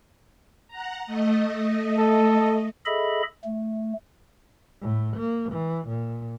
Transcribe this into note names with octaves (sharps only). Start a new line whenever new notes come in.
F#5 A#5
A3 D#5
A4
G#4 A4 D#5 E5 B5
A3
A2
A#3
E3
A#2